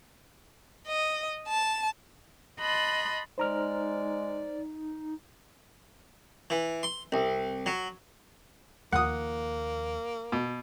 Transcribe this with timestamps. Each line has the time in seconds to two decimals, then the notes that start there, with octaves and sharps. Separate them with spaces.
0.86 D#5
1.48 A5
2.59 D#5 A5 B5 C6 F#6
3.38 G#3 D#4 C5 D5 A#5 F6
6.50 E3
6.83 C6
7.12 C2
7.66 F#3
8.93 D#2 F3 A#3 F#5 D#6
10.32 B2